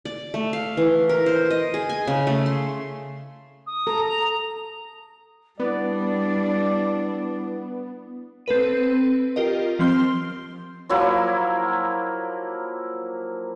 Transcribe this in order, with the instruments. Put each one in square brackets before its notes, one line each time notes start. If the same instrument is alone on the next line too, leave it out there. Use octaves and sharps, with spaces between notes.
[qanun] D5
A3
F5
E3
A#4
C5
D#5
G#4
G#5
C#3
A3
C6
[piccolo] D#6
[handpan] A4 [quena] A#5
[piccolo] F7
[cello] G3 D4 [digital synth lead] B3 [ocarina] E4 [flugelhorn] D5
[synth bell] C4 A4 B4 D#7
F4 G4 A#4 D#5
F3 C4 C6 F6 G7
[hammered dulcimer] F3 F#3 A#3 E4